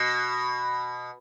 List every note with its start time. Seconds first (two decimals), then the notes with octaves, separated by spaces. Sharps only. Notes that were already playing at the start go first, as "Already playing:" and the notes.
Already playing: B2